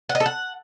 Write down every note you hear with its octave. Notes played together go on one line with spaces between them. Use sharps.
F#5
D#5
A4
F#5